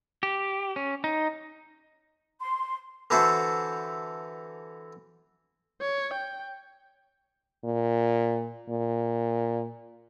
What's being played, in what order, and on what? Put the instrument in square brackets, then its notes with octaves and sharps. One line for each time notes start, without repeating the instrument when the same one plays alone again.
[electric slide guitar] G4
C#4
D#4
[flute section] C6
[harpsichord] D3 E3 E4 F#4 A4 C5
[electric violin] C#5
G5
[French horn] A#2
A#2